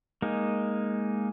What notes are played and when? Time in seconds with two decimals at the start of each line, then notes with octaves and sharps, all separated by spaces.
0.22 G#3 A#3 D#4